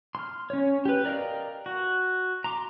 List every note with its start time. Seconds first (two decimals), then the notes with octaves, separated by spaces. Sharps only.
0.15 C6 F6
0.50 C#4 C#5
0.85 G4 B4
1.05 A#4 D5 D#5 F5 G5
1.66 F#4
2.44 A#5 C6 D6